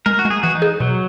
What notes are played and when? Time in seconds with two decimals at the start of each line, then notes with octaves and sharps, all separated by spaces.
0.06 G#3 A#4
0.19 F#4
0.25 G#3
0.30 G#4
0.43 E3 F#4
0.55 D#4
0.62 G#4
0.80 B2 F#3